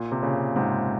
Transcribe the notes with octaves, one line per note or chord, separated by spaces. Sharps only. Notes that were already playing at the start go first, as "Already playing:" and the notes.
Already playing: A#2
C3
A#2 C#3
G#2 C3